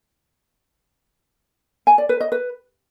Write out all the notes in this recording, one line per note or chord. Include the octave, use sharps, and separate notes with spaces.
G#5
D5
B4
D#5
B4